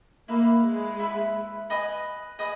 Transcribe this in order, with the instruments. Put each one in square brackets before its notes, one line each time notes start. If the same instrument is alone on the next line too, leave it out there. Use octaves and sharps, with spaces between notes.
[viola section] A#3 [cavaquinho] E4 B4 E5 B5
[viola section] G#3
[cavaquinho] E4 B4 E5 B5
B4 D#5 G#5 D#6
B4 D#5 G#5 D#6